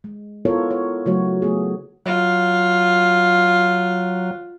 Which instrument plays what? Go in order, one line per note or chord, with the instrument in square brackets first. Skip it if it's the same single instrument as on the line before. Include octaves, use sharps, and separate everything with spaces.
[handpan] G#3
B3 E4 F4 A4 A#4 C#5
C#5
C#3 F#3 A3 F#4 C#5
A3 B3 G#4
[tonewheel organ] F#3 [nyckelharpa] F4